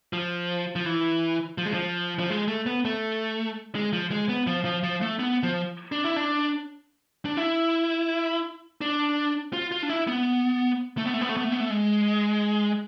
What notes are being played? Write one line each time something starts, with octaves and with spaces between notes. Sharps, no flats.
F3
F3
E3
F3
G#3
F3
F3
G#3
A3
B3
A3
G#3
F3
G#3
B3
F3
F3
F3
A3
B3
F3
D4
E4
D4
D4
E4
D4
F4
F4
D4
E4
B3
A3
B3
A3
B3
A3
B3
A3
B3
A3
G#3